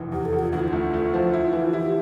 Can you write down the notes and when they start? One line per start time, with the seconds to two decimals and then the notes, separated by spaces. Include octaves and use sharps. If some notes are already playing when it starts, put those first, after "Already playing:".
Already playing: F1 E3
0.12 E2 G4
0.25 A4
0.33 E2
0.39 F4
0.52 D2 F4
0.60 E4
0.68 A3 F4
0.93 A3
1.14 F3
1.34 E4
1.53 E3
1.73 E4 G4